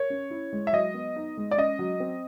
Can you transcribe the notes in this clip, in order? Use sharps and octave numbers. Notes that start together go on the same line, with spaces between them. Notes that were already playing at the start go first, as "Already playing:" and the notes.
Already playing: A#4 C#5
C#4
E4
G#3
E5
F#3 D#5
B3
D#4
G#3
D5
C#4 D#5
F#3
C4